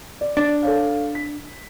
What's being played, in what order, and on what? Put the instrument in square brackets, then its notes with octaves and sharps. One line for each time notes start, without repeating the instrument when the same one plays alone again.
[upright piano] D5
[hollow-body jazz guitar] D4
[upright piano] A4 C#5 F5
B6